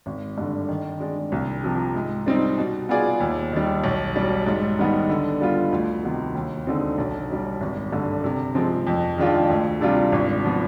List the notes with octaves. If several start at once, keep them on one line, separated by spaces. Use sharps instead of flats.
G#1
G2 D3
D#3
G#3 D4
C2
C3 F3
G#2
G3 C4 D#4
B2
B3 F4 G#4 D5
D#2
D#3 G3
B1
B2 G3
G#2
D#3 G3 B3 D#4
D3
G3 B3 F4
D2
C3 D#3 B3
D#2
D3 G#3 C4 D#4
B1
B2 G3
G#1
G2 D3
C3
F3 G#3 C4
F2
D#3 G#3 D4 F4
D2
C3 G3 D4 F4
G#1
F3 B3